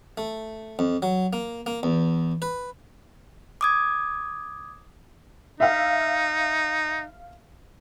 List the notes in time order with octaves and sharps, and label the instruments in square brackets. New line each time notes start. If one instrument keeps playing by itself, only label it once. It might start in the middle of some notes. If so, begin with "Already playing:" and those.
[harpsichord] A3
F2
F#3
A#3
A#3
E2
B4
[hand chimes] D6 D#6 G#6
[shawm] D#4 [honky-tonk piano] E5 F5